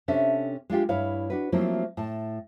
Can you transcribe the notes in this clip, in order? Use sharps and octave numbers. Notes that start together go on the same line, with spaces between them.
C3 C#4 D4 A4 E5
G#3 D4 F4 G4
G2 E4 C#5 F5
D4 F#4 B4
F3 F#3 A3 A#3 C4 E4
A2 A5